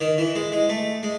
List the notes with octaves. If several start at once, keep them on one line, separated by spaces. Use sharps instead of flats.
D#3
E3
G#3
G#3
A3
G#3